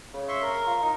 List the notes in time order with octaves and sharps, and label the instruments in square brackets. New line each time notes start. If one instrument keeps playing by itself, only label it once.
[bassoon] C#3
[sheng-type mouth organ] E5 C6 C#6
A#4
[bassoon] F4
D#4